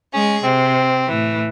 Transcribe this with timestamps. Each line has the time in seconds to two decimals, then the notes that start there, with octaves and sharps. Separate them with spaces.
0.14 G#3 C#4 G#4
0.43 C3 C4
1.07 A2 E3